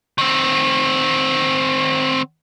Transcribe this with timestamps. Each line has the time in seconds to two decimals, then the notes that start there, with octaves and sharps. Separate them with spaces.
0.18 D#3 C4